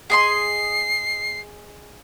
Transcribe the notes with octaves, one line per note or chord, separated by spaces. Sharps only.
G#4 D#5 C6 C7